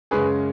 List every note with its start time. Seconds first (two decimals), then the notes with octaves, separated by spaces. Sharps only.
0.11 F#2 C#3 G#3 C#4 G#4 B4